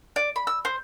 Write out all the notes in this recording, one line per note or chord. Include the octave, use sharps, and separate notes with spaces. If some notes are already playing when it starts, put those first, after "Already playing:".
D5
B5
E6
C5